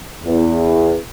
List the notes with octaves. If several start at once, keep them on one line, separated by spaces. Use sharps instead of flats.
E2